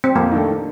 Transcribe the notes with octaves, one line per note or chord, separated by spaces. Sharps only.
C4
F2 A#3
D#3 A3 D4 A4